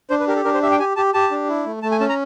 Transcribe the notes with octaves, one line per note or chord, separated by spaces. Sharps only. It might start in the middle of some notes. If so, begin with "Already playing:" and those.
D4 C5
B4
G4 A#4
A4
D4 A#4
C5
G4 E5
G5
G4 G#5
G4 A5
G4 A5
D4
E4
A3
A3 A5
G#5
C#4 A5
A#5